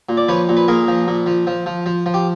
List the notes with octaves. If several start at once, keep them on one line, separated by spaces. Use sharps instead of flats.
A#2
D5
F3 B4 C#5
A#2
B4
A#2 G#4 A#4
F3
A#2
F3
F3
F3
F3
F3
G4